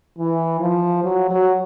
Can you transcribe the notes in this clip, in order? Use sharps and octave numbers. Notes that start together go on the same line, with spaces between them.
E3
F3
F#3
F#3